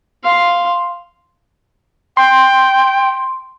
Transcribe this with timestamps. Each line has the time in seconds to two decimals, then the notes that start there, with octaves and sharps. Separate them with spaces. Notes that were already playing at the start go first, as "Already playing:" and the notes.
0.23 F5 C6
2.17 G5 C6